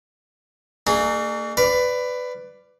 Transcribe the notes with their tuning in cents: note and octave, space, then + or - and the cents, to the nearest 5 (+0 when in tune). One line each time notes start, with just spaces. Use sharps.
A#3 -45 D4 +45 G#4 +0
B4 +15 D5 +0 F5 +0